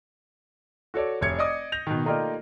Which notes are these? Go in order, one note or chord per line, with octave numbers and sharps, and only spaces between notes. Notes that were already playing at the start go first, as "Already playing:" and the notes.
F#4 A4 C#5 D5
F1 C#5 G#6 C#7
D5 D#5 D#6
G6 A#6 F7
B2 D#3
A3 A#3 D#4 F4 G4 D5